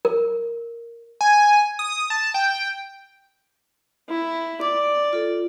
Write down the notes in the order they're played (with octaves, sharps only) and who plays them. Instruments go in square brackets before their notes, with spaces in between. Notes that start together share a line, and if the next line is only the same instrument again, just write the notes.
[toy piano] A#4
[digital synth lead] G#5
D#6
A5
G5
[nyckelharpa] E4
[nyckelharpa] D5 [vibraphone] D6
[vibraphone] F4 A4